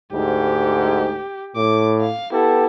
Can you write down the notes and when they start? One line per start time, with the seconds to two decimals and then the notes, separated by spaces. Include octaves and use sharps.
0.14 D2 G#2 G4
1.56 A2 D6
2.01 F5
2.33 B3 E4 G4 A4